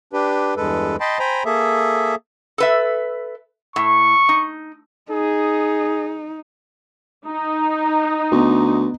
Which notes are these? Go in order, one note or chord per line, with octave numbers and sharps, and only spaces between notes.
D4 G4 B4
E2 G2 G#3 A4 B4
D#5 G5 A5 B5 C6
C5 G5 G#5 A#5 B5
A#3 G#4 A4 E5
A4 B4 E5
A2 C#6
D#4
D#4 G#4
D#4
D2 B3